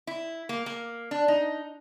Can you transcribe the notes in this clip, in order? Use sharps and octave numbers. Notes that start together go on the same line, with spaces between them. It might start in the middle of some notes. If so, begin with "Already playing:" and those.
E4
A#3
A#3
D4
D#4